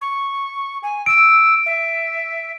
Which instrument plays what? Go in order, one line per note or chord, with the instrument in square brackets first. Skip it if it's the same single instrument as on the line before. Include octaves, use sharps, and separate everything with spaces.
[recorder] C#6
G#5
[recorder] E6 [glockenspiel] D7
[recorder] E5